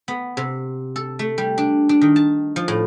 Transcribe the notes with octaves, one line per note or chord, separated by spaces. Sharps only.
B3
C3
A4
A3
G3
D4
D4
D#3
A5
F3
A2